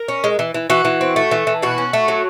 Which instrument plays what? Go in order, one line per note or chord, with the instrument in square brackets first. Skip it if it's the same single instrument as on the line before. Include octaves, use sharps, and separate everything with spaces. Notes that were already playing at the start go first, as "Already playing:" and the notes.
Already playing: [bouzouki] A#4
C#4
G#3
E3
E3
E3 F#4
E3
C4
A3
E3
E3
B2 F#4
C#4
A3
F#3